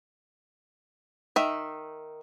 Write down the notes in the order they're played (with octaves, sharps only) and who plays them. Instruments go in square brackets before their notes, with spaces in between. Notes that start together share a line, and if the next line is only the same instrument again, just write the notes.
[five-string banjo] D#3 E5